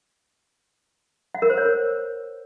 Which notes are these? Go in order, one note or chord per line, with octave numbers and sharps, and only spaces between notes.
F#5
A#4
C5
C#5
A#4